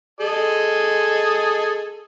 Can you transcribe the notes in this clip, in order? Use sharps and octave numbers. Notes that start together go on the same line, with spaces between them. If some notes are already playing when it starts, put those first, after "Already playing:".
G#4 A4 D#5